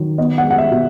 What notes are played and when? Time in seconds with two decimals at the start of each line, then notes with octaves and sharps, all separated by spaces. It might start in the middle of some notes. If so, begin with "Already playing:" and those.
Already playing: D#3 F#3
0.18 B3 D#5
0.38 F#5
0.44 G#3
0.51 F#5
0.58 E5
0.71 B2